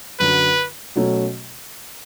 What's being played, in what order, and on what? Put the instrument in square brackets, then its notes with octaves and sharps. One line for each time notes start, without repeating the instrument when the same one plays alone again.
[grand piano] F#2 D3 F#3 [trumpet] B4
[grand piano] B2 F#3 A3 C#4